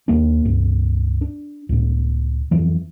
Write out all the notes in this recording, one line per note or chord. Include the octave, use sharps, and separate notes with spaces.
D#2 A#3 D4
C#2 G2
D4
C#2 A2
F2 E3 F#3